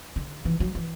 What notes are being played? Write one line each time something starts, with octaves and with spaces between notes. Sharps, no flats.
D3
E3
F#3
E3